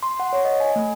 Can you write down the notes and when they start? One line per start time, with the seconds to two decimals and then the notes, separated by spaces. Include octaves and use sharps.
0.03 C6
0.20 F#5
0.33 C#5
0.45 D#5
0.60 G#5
0.76 A3